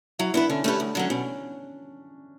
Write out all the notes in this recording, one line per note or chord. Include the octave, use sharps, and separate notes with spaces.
F#3 E4
B3 D4 E4 B4
D3 C#4
A3 C#4 D4 G4 B4
D2
D3 F#3 C#4
B2 C#4